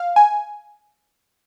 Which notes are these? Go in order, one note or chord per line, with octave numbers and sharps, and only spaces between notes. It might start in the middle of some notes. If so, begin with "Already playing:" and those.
Already playing: F5
G#5